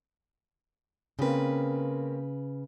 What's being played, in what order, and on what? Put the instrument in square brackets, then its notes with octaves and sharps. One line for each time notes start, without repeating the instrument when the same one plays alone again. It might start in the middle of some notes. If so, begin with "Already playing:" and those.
[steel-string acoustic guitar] C#3 B4 [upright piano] A#3 C4 C#4